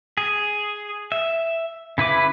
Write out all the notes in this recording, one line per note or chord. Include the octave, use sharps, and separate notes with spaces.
G#4
E5
C#3 E4 B4 D6